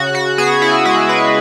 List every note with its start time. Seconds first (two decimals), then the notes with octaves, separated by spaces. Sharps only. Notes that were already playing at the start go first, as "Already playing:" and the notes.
Already playing: C#3 F#4
0.15 F#4
0.38 B3 G#4
0.62 E4
0.85 G#3 E4
1.09 B4